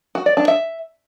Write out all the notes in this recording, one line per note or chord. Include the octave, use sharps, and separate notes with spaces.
F#4
D5
D4
E5